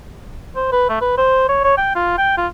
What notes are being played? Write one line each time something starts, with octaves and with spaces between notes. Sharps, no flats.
C5
B4
A3
B4
C5
C#5
C#5
G5
F4
G5
F4